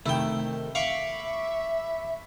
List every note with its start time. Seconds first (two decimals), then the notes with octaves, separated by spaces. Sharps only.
0.06 C3 D#3 A3 E4 G5
0.75 E5 F5 B5 C#6 D6